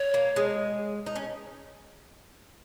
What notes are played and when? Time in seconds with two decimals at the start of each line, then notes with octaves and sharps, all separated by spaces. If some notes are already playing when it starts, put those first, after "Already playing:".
Already playing: C#5
0.14 A#3
0.36 G#3
1.06 D#4
1.16 C#4